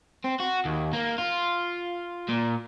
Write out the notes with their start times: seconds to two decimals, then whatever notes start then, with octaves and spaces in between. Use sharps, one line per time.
0.25 C4
0.40 F#4
0.65 D#2
0.93 A#3
1.18 F4
2.29 A#2